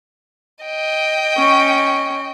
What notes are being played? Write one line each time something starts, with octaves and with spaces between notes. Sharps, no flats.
D#5 G5
C#4 C#6